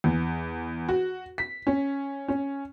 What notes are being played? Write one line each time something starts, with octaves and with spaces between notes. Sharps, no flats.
E2
F#4
B6
C#4
C#4